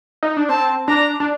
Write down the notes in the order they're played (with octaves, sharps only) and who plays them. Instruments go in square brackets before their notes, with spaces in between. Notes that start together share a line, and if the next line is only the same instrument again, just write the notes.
[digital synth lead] D#4
D4
[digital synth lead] C4 [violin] A5
[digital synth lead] D4 [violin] A#5
[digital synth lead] D4